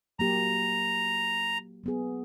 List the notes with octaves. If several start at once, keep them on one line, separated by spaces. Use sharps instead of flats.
F#3 A#3 G4 A#5
F#3 B3 G#4